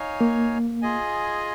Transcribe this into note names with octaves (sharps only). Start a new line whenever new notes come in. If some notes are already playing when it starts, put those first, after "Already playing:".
Already playing: D#4 C#5 F5 G#5
A#3
F4 G#4 D#5 G#5